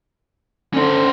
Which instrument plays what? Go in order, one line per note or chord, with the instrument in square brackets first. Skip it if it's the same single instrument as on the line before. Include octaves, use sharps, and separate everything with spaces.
[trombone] D3 [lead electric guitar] C#4 C5